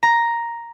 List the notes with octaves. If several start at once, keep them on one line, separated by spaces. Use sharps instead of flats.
A#5